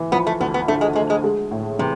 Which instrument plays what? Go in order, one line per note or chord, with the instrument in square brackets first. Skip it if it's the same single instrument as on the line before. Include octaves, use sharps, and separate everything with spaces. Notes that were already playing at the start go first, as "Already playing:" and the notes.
Already playing: [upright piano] E3
[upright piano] F3 [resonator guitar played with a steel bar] B3
[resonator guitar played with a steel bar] A3
[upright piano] D2 [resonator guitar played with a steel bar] B3
[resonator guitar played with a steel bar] B3
[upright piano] D3 [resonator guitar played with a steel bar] A3
[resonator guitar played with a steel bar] G#3
[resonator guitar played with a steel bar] G#3 [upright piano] A3
[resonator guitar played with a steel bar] G#3
[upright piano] G#3
A2
[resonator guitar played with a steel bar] C3 [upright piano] E3